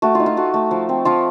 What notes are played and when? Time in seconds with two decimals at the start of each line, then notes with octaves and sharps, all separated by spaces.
0.02 A3 F#4
0.15 D#4 F4
0.26 F4
0.37 A3 F#4
0.54 A3
0.71 F3
0.89 C4
1.05 F3 F4